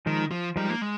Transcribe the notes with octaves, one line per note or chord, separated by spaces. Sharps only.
D#3 F3 G#3 D#4 A#4
F3
F3 G3 G#3 D#4 A#4
A#3
G#3